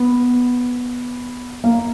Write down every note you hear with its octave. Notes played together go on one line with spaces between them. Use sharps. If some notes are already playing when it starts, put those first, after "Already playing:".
Already playing: B3
A#3